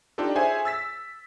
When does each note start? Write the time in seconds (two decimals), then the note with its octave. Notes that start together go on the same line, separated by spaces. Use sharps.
0.18 D4 D#4 F4 G4 A4
0.36 G#4 C5 C#5 E5 G#5
0.65 E6 A6 B6